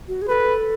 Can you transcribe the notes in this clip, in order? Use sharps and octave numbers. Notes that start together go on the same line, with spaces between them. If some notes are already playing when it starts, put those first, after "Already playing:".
F#4
G#4
A4 B4